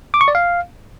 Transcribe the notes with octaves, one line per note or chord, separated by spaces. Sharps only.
D6
C#6
D5
F5